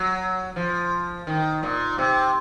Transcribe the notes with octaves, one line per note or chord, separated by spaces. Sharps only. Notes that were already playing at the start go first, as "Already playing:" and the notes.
Already playing: F#3
F3
D#3
A#2
C3